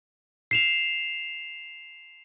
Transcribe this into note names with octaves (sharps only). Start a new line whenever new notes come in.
C7 E7 F7